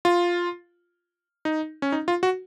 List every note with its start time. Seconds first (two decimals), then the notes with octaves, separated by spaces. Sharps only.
0.05 F4
1.45 D#4
1.82 C#4
1.92 D#4
2.08 F4
2.23 F#4